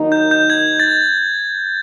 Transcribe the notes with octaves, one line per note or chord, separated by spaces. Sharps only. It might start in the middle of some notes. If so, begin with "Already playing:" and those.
Already playing: D#2 D#3 F#3 A#3 D#4
G6
G6
G#6
A6